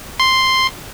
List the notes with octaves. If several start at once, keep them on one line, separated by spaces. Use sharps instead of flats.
C6